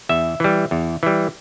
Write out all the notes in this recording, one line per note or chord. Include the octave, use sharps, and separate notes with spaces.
E2 E5
E3 G3
E2
E3 G3